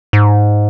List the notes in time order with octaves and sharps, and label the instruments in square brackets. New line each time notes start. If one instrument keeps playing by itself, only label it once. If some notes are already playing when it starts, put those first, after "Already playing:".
[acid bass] G#2